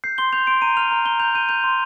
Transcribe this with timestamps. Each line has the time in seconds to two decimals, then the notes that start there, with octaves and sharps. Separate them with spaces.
0.04 G6 C7
0.18 C6 G7
0.33 G6 F7
0.47 C6 D7
0.62 A#5 D#7
0.77 F6 F7
0.92 A#5
1.05 A#5 G7
1.20 G6 F7
1.35 G6 D#7
1.49 G6 F7
1.64 C6